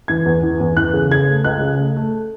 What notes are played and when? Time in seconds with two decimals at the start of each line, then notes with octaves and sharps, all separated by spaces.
0.08 E3 G#6
0.26 E2
0.43 E3
0.60 E2
0.77 E3 F#6
0.94 C#3
1.11 C#3 G#6
1.29 A3
1.44 C#2 F#6
1.62 C#3
1.79 A3
1.96 A3